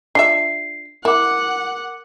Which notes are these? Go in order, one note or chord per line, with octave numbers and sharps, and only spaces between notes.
D4 F4 E5 C7
E4 A#4 F#5 D6